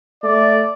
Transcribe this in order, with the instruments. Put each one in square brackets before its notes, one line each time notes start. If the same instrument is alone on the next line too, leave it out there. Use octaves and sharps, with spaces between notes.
[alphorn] A3 [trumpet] D5